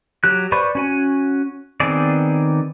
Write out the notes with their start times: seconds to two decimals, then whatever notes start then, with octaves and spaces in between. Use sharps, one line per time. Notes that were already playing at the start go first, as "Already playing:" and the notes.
0.24 F#3 G4 F#6
0.52 B4 C5 D5 B5 C#6
0.75 C#4 F#4 G#5
1.80 D#3 B3 C4 G#4 D5